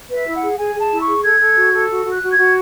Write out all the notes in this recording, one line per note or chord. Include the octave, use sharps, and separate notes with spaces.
B4
E5
E4
G#4 F#5
G#4 G#5
G#4
A5
E4
C#6
G#4
A4 G#6
A4
F#4
A4
F#4
F#4
F#6
F#4
G#6
F#4